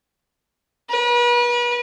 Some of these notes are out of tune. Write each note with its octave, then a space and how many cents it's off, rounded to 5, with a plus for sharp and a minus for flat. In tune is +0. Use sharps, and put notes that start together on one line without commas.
B4 -40